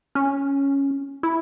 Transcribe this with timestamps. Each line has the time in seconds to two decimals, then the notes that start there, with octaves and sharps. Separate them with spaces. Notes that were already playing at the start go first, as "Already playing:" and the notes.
0.15 C#4
1.23 E4